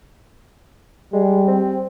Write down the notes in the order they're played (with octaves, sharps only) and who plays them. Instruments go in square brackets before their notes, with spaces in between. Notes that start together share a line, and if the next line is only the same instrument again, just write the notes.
[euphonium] G3 [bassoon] G#3
[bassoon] C4